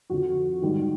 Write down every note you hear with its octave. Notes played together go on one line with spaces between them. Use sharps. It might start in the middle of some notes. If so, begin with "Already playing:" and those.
F2 D3 F3 F#4
G#2 D#3 G3